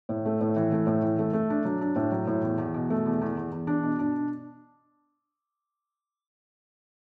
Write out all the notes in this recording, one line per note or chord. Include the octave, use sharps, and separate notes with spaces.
A2
A3
A2
E3
A3
A2
E3
A3
A3
D4
F#3
D4
A2
F#3
A2
E2
E2
B2
A3
E2
E2
E2
E2
D4
B2
D4